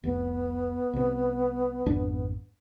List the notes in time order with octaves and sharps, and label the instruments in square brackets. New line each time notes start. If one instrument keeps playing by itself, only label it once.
[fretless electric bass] F1 C2 [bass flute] B3
[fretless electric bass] C2 C3
G#1 F2 D4